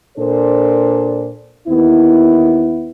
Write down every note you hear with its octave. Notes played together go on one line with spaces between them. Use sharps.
A#2 D4 A4 C5
D#2 B3 E4